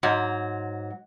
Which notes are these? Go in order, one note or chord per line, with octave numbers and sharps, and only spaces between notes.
G#2 F#3